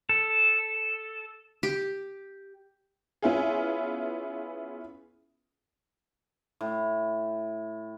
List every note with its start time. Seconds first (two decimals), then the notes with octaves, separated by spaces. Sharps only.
0.09 A4
1.63 G4
3.22 B3 C#4 E4 F4 G#4
6.61 A2